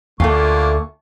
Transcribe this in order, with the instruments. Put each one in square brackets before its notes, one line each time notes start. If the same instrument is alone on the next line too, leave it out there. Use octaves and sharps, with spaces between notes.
[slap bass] D2 [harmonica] D3 A#3 C#6 [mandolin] A3 F4